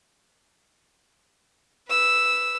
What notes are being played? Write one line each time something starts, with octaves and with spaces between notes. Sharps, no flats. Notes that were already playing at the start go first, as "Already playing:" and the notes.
B4 E6